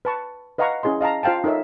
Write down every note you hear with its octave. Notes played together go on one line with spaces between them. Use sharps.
B4 A5 C#6
B4 D#5 F5 F#5 A#5 C#6
C#4 E4 G#4 D#5 C6
D#5 F5 A5 A#5
F4 C5 F5 G5 A5
D#4 A4 A#4 C#5 E5